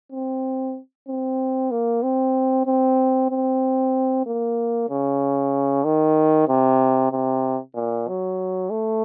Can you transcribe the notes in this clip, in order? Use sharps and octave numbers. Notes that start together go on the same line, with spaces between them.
C4
C4
A#3
C4
C4
C4
A#3
C#3
D#3
C3
C3
A#2
F#3
A3